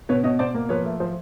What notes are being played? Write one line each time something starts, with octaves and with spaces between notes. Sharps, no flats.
B2 B4 C#5
B2 C#5 D#5
B2 C5 D5
A#3
F3 B4 C#5
A3
F3 C5